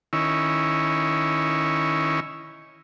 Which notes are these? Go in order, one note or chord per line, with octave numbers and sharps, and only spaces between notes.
D#3 C#4 E4